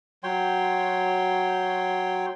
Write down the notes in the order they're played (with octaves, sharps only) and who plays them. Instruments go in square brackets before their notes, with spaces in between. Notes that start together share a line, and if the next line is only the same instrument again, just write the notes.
[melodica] F#3 C#5 G5 C6